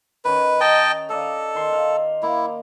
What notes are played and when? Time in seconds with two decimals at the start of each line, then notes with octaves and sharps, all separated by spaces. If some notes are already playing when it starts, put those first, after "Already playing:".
0.25 D#3 C#4 B4
0.60 D#5 G5 A5 A#5
1.10 A4 D5 D#5 F5
1.55 D#3 C6
1.73 F5
2.23 A#3 E4